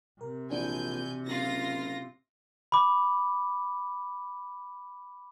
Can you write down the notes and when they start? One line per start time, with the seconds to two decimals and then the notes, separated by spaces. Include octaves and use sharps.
0.21 C3 A#4
0.50 A#1 E3 D4 F#4 G#5 G6
1.26 F#1 F4 A#6
2.72 B5 D6